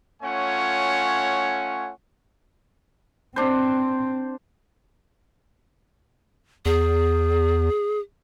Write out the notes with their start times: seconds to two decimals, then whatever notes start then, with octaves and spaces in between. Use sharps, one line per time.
0.23 A3 C#4 F4 C#5 F#5 G#5
3.36 C4 D4 C5
6.66 E2 G#4